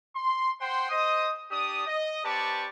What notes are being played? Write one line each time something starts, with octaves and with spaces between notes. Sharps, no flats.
C6
C5 F#5 G5 C6
C5 D#5 D#6
D4 G4 D5 D#6
D#5
C4 G4 B4 D5 A5 C#6